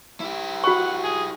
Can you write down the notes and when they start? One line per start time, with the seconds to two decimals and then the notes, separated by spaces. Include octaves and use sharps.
0.21 E4 G4
0.64 F#4 F#5 C#6
1.04 G#4